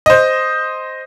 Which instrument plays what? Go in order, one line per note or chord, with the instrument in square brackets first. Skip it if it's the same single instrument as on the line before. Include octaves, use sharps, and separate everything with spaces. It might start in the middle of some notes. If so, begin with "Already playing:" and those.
[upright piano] C5 D#5